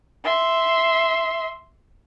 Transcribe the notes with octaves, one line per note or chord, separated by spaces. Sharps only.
E5 C6